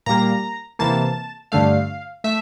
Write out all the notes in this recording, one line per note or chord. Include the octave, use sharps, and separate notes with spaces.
A#2 G3 A#3 A#5
C3 E3 A#3 A5
G2 D3 A3 F5
A3 E5